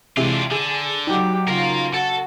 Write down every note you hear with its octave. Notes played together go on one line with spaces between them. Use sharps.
C3 E3 G#3 D4 F4
D3 G#4
F#3 D#4 F#4 G4
C#3 F4 A#4 F5
F#4 A4